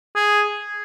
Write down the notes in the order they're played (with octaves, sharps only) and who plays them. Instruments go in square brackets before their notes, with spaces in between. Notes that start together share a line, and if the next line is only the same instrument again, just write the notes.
[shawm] G#4